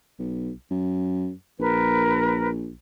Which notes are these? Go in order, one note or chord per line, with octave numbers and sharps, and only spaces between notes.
B1
F#2
A#1 A#4 B4